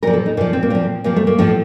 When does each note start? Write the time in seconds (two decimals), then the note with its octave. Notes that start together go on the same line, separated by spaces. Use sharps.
0.03 A#2 F3 A#4
0.13 A4
0.26 D#4
0.37 A#2 F3 A#3
0.53 C4
0.63 A#3
0.70 A#2 F3 C4
1.04 A#2 F3 A#3
1.16 A3
1.27 A#3
1.38 A2 F3 A4